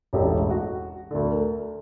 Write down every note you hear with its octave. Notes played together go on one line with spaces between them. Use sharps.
E1 A1 A3 G4
F#4
D2 D3
A#4